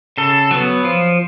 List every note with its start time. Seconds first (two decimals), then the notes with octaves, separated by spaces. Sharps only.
0.18 C#3 A4
0.51 F#3 B3
0.84 F3